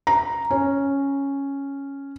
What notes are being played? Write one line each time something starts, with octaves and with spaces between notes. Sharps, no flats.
A#5
C#4